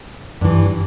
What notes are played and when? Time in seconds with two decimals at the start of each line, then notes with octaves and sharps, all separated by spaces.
0.41 G2 E3